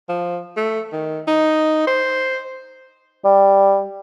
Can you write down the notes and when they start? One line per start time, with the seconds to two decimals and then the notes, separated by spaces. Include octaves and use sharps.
0.09 F3
0.57 A3
0.92 D#3
1.27 D#4
1.87 C5
3.24 G3